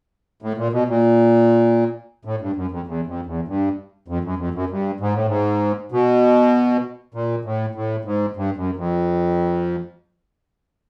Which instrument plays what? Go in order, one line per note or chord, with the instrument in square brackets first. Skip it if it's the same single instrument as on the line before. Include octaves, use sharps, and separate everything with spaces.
[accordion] A2
A#2
B2
A#2
A2
G2
F#2
F2
E2
F2
E2
G2
F2
F#2
F2
F#2
G2
G#2
A2
G#2
B2
A#2
A2
A2
G#2
G2
F#2
F2